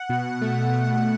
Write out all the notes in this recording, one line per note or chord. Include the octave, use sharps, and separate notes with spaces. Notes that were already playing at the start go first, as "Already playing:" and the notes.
Already playing: F#5
B2
A3
A3